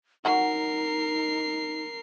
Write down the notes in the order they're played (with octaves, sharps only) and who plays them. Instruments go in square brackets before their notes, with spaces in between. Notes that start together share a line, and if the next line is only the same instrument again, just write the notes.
[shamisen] F#3 F#4 F#5 [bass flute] D#4 [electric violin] A#4 C7